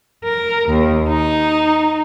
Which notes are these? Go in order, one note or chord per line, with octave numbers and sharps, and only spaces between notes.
A#4
D#2
D#4